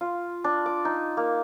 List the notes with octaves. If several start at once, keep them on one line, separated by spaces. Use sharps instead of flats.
F4
D4
D6
D#4
A#3